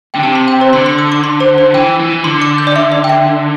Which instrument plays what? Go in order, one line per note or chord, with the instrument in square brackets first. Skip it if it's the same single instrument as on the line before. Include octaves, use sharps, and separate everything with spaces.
[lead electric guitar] D3 [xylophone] G5
[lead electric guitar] C3 [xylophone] A5
[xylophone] C6
G5
C5
[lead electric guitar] D3 [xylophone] C6
[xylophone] C6
E6
D6
C6
C5
C5
[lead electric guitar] E3 [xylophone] G5
[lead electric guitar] E3
[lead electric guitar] D3 [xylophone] C6
[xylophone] D6
G6
D5
E5
D5
G5
E5